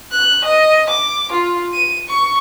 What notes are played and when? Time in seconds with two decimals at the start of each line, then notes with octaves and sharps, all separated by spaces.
0.12 F#6
0.44 D#5
0.90 D6
1.32 F4
1.74 D#7
2.08 C#6